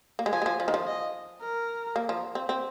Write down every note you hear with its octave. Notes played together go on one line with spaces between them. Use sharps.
A#3
G#3
F3 G#5
G#3
F3
F3
D#3
F3
D#5
A#4
A#3
F3
C4
C4